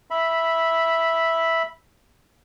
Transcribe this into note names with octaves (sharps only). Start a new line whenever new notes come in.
E5 B5